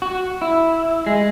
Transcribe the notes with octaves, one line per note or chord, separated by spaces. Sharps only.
F#4
E4
G#3